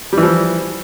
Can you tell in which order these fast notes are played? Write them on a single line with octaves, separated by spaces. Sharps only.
G3 E3 F3